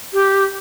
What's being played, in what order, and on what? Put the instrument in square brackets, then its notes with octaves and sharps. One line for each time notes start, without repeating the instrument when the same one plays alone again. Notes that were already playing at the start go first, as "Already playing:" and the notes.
[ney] G4